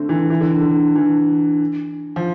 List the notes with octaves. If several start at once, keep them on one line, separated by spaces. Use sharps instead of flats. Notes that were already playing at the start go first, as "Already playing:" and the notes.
Already playing: D3 A3 C4
E3
E3
D3
D3
E3
F3